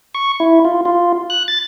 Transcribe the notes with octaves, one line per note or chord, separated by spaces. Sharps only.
C#6
E4
F4
F4
F#6
A6